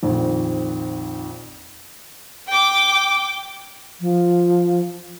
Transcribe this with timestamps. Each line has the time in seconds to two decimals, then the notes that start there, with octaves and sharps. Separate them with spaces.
0.02 A#1 F2 D#3
2.47 G5 D6
4.00 F3